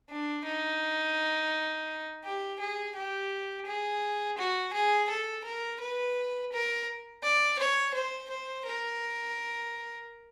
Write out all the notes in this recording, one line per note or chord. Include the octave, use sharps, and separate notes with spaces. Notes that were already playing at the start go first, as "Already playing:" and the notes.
D4
D#4
G4
G#4
G4
G#4
F#4
G#4
A4
A#4
B4
A#4
D5
C#5
C5
C5
A#4